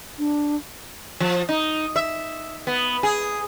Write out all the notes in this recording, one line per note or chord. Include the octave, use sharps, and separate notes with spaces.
D4
F3
D#4
E5
B3
G#4